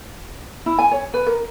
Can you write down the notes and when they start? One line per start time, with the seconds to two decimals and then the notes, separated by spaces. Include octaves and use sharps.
0.66 E4
0.78 G#5
0.91 C#5
1.14 B4
1.27 A#4